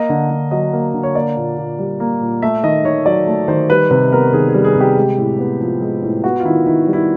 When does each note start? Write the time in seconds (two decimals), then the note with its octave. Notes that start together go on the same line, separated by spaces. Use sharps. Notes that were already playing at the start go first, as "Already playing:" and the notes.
Already playing: A#3 D#5
0.09 D3
0.30 D3
0.51 F#3 D#5
0.73 A#3
0.94 D3
1.03 C#5
1.15 A#3 D5
1.36 A#2
1.57 A#2
1.79 G3
2.00 A#3
2.21 A#2
2.42 A3 E5
2.63 D#3 D#5
2.85 D#3 C#5
3.06 F#3 D5
3.27 A3
3.48 D#3 C5
3.70 G3 B4
3.91 C3 B4
4.12 B3 A#4
4.33 D#3 G#4
4.49 G#4
4.54 G3
4.64 G#4
4.75 C3
4.81 G4
4.97 G#3
5.18 A2
5.39 B3
5.60 F3
5.81 G#3
6.03 A2
6.24 B3 F#4
6.40 F4
6.45 D#3 E4
6.66 D#3 E4
6.87 G3
6.93 E4